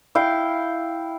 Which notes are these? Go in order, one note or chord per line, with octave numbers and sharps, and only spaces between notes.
E4 F5 G5